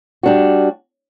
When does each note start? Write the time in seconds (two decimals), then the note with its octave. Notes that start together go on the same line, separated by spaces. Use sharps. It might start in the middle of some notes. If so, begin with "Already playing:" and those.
0.23 G3 D4 F#4